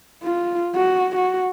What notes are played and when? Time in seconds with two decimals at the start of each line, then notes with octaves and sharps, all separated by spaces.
0.23 F4
0.75 F#4
1.16 F#4